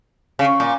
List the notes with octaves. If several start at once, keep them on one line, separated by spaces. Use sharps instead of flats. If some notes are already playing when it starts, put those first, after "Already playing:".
C#3
A#2